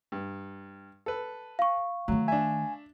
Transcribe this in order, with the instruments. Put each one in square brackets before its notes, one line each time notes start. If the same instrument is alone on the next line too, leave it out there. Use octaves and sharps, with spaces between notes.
[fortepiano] G2
A4 B4
[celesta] F5 C#6
[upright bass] D#3 A3 [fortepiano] F#3
[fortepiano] D4 E5 [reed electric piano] G#5